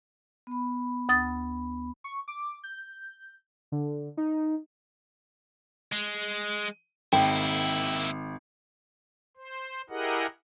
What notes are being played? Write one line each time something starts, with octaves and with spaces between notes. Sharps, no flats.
B3 B5
D2 D#6 A6
C#6
D6
G6
D3
D#4
G#3
G#1 A#3 E4 G5
C5
E4 G4 G#4 A#4 D#5 F#5